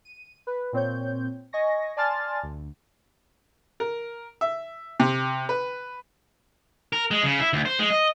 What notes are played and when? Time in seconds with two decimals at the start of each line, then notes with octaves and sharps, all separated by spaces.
0.05 D#7
0.47 B4
0.73 A#2 C4 C#5 G6
1.53 D#5 G#5 C#6 A#6
1.97 D5 G#5 A5 C6 F6 A6
2.43 D2
3.80 A#4
4.41 E5
5.00 C3
5.49 B4
6.93 A#4
7.11 G#3
7.24 C#3
7.40 E4
7.53 D2
7.65 C5
7.79 G#3
7.90 D#5